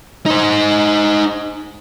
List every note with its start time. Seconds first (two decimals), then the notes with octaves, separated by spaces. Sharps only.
0.26 D#4 C5